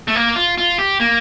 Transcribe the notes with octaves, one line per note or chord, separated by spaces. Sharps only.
A3
A#3
F4
F4
G4
A#3